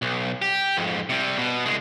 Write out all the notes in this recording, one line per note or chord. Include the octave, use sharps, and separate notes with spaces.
B1
G4
F2 G#2
C3 G3
B2
C2 G#3